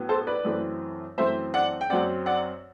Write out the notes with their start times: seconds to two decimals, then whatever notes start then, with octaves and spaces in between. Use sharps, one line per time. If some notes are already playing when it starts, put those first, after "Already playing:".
Already playing: A2 F#3 B3
0.09 A4 C5
0.27 B4 D5
0.45 F#2 E3 A3 C4
1.18 F#2 E3 A3 C4 C5 E5
1.54 D5 F#5
1.81 G5
1.90 F#2 F#3 C4 D5 F#5
2.26 D5 F#5